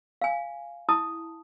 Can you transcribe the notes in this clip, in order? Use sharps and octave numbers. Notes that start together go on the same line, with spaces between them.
F5 G#5
E4 A5 D#6